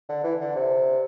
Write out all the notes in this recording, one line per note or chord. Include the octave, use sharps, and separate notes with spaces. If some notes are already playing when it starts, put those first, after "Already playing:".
D3
E3
D3
C3